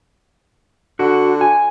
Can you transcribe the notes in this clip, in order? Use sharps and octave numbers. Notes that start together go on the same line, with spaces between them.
D3 F#4
G#5